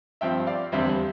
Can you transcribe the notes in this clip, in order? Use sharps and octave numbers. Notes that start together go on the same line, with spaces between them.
G2 F3 C4 E5 G5
D5 F5
F1 E2 D3 G3 C4 C5 E5